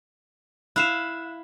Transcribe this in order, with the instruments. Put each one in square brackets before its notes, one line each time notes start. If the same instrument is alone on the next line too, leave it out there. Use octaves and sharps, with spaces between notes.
[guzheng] E4 F5 [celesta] F#6 E7